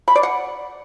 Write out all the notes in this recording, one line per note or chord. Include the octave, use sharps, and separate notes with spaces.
B5
D5
F#5